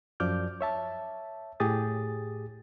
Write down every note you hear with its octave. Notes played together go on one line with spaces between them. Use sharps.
F#2 F3 D5 D6 F6 G6
C#5 E5 A5
A2 G4 G#4 D#6 A6